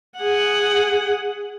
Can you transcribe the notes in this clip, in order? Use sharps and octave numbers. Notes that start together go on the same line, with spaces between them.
G#4 F#5